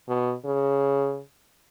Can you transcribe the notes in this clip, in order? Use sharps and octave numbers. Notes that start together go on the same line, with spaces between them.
B2
C#3